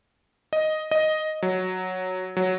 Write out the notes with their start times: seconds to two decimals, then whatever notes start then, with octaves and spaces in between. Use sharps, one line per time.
0.53 D#5
0.91 D#5
1.42 F#3
2.37 F#3